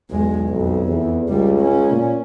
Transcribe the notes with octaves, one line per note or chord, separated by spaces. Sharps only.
B1 E2 G#3
B1 F2
E2
C#2 G3
C#4
A#2